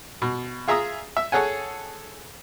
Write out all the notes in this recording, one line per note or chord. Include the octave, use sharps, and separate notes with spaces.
B2
F4 G#4 E5 A#5 D#6
E5
G#4 A4 C#5 F#5 G#5